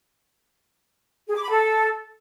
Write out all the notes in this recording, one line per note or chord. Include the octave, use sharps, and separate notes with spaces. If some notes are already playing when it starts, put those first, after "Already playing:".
G#4
D6
B5
A4